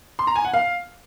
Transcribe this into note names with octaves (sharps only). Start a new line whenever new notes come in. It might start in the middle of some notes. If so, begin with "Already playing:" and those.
C6
A#5
G#5
F#5
F5